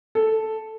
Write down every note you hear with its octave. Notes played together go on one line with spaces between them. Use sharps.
A4